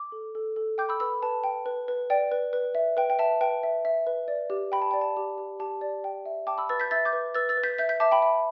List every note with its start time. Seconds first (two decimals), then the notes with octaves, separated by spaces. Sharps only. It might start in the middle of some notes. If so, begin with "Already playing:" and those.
Already playing: D6
0.12 A4
0.35 A4
0.56 A4
0.78 G5 D6 G6
0.89 B5 E6
1.00 B4 B5 E6
1.23 B4 A5
1.44 G5
1.66 B4
1.88 B4
2.10 D5 G5
2.32 B4
2.53 B4
2.75 E5
2.97 B4 G5
3.10 G5
3.19 E5 A5
3.41 B4 G5
3.63 E5
3.85 E5
4.07 B4
4.28 D5
4.50 G4
4.72 G5 B5
4.82 A5
4.91 D5 G5
5.01 A5
5.17 G4
5.38 G4
5.60 G4 A5
5.81 D5
6.04 G5
6.26 E5
6.47 G5 A5 D6
6.58 B5 E6
6.69 B4 E6 A6
6.80 G6 B6
6.91 E5 E6 A6
7.05 D6 G6
7.13 B4
7.35 B4 E6 A6
7.49 E6 A6
7.57 B4
7.64 G6 B6
7.78 E5 G6 B6
7.89 G6 B6
8.00 E5 A5 D6
8.11 G5 B5
8.22 E5